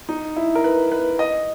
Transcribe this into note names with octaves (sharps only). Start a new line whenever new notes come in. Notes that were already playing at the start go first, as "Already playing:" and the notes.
D#4
E4
A#4
B4
B4
D#5